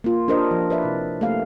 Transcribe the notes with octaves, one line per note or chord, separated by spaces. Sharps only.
A#3 F4
D4 G4 A#4 C5 D#5
F3
B4 D5 E5
C3 E4
A3 A#3 G4 F5